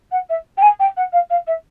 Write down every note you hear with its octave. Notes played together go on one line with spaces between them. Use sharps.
F#5
E5
G5
G#5
G5
F#5
F5
F5
E5